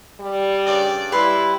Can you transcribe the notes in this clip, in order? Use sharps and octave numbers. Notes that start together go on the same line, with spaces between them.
G3
G2 C#3 D5
G3 E4 B4 C6